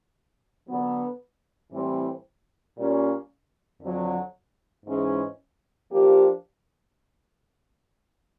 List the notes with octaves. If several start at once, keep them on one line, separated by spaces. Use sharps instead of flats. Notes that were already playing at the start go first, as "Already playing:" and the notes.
D3 F#3 B3
A2 E3 G3 C4
A#2 G3 A#3 C#4
F2 D3 F#3
G#2 E3 G#3 C#4
F3 A#3 D4 G4